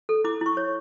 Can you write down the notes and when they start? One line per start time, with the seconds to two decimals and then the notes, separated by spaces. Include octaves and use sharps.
0.09 A4
0.24 E4 D6
0.41 E4 C#6
0.57 C#5